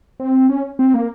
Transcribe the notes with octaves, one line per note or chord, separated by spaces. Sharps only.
C4
C#4
C4
A#3